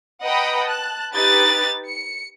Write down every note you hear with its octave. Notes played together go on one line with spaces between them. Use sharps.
B4 D#5 F#5 G5 A#5 B5
A5 F#6
D#4 G4 B4 F#6 A6
C#7